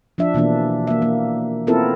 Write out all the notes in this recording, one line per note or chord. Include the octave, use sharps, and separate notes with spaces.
F3 D4 E5
B2 E3 A#3 D4
A#3 E5
A#3
B3 C4 E4 F4 A4 A#4